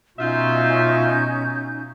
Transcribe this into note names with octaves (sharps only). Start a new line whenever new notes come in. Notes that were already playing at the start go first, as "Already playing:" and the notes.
B2 C#4 D#4 F4 E5 G6